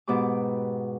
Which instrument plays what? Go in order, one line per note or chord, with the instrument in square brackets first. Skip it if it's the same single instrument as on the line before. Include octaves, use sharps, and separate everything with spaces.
[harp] G#2 B2 B3 G4 D6